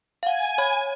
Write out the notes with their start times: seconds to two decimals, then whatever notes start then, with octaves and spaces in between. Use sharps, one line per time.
0.23 F5 F#5 G#5
0.58 C#5 B5